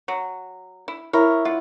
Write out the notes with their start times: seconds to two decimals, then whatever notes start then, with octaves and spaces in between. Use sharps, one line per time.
0.08 F#3
0.88 E4
1.13 E4 A#4 C#5
1.45 F4 F#5